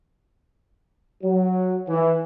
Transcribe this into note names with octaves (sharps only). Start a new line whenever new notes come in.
F#3
E3